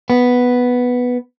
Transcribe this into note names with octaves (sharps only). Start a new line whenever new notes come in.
B3